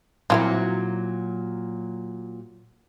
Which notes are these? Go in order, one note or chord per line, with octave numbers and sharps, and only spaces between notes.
A#2 F#3 C4 E4 F4